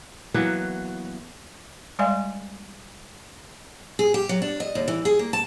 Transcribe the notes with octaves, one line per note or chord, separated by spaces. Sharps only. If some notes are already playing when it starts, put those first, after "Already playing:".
E3 F#3 A#3 B3
G3 G#3 D5 F5 G#5 C6
G#4
G4
F#3
D4
D#5
D#2
E3
G#4
A#3
A5